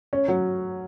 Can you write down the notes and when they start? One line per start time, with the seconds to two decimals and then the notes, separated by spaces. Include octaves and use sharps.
0.13 C#4
0.28 F#3